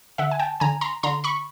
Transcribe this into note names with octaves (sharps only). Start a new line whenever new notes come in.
D3 E5 F#5
G#5
G5 A5
D3 G#5 A#5
A#5 C6
D3 A#5 C6
B5 C#6